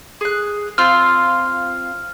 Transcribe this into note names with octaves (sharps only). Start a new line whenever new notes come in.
G#4 F#6
C4 F4 F6